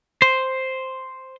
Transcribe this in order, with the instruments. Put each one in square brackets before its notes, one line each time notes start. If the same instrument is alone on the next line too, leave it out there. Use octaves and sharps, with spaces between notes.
[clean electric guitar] C5